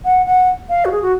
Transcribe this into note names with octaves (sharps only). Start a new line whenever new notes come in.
F#5
F#5
F5
F#4
G#4
F#4